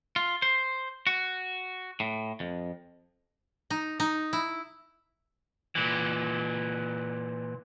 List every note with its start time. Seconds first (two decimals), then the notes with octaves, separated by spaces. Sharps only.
0.16 F4
0.42 C5
1.07 F#4
2.00 A2
2.40 F2
3.70 D#4
4.00 D#4
4.33 E4
5.75 A#2 E3